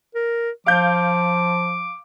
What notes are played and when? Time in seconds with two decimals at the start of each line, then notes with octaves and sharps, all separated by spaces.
0.15 A#4
0.67 F3 F5 D6 G6